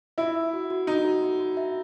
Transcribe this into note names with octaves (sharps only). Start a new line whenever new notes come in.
E4 E5
E5
F#4
F#4
D#4 F#4
F#4
F#4
F#4
E5